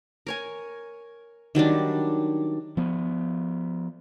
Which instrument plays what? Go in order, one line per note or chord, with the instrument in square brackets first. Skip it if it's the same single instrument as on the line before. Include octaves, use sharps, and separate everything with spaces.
[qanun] A#4 C#5 G#5
D#3 F#3 G3 D4
[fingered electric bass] F3 B3